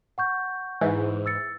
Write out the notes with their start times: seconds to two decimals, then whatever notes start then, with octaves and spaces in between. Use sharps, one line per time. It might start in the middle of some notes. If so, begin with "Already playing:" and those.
0.18 F#5 C#6 G6
0.81 G#2 E3
1.26 E6 A6 C#7